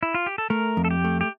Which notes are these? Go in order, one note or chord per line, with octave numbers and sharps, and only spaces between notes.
E4
F4
G4
A4
A3 A#4
F2
A4
G4
A3
G4